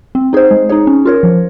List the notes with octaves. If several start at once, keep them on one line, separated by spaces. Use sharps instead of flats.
C4
D#4 G#4 C5
G#3
D#4 G#4 C#5
C#4
F4 A#4 C#5
F3